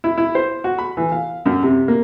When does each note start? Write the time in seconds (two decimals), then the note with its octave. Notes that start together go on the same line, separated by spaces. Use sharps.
0.04 E4
0.18 E4
0.35 C5
0.64 F#4
0.78 B5
0.97 E3
1.12 F5
1.46 F#2
1.63 C3
1.88 A#3